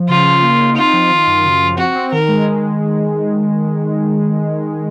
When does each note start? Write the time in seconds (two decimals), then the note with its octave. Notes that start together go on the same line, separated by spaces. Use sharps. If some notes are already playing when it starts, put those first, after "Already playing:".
Already playing: F3
0.09 C#3 F4
0.26 C#3
0.43 A#3
0.59 D#4
0.77 C4 F4
0.93 F3
1.10 D#3
1.27 F#2
1.45 C#3
1.62 F3
1.78 C4 F#4
1.95 C4
2.12 D#3 A#4
2.28 G#3